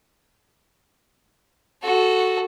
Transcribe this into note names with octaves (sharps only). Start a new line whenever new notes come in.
F#4 A4